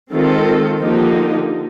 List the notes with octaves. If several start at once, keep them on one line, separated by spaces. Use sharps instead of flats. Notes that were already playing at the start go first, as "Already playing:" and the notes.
D#3 G#3 C4 F4 A4
D3 F3 A#3 D#4 G4